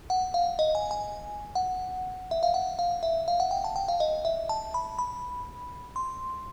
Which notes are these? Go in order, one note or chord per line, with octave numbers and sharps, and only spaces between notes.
F#5
F5
D#5
G#5
G#5
F#5
E5
F5
F#5
F5
E5
F5
F#5
G5
A5
G5
F5
D#5
E5
A5
B5
B5
C6